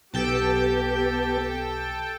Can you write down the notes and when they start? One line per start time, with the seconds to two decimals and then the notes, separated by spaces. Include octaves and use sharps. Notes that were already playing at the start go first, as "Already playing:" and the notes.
0.14 B1 B3 G4 A4 G5 A5